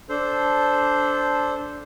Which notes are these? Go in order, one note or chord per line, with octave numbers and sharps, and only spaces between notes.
D4 A4 C5